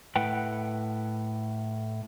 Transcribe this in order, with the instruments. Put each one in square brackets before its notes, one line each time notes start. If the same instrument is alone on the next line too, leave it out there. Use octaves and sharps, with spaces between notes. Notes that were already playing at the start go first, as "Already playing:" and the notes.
[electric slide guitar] A2 B4 F#5 G5